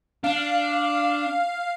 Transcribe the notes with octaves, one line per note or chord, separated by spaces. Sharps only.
D4 F5